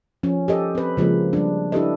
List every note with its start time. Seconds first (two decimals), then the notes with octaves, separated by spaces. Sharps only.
0.23 F3 C#4
0.48 G4 A4 D#5
0.75 C4 B4
0.97 C#3 F3 G#3 A#3
1.33 G3 D4
1.72 D4 E4 G4 A4 B4 D#5